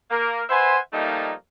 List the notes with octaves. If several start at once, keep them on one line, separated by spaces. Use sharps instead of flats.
A#3 A#4
B4 C5 E5 F#5 G#5 C6
F3 G3 A3 A#3 D#4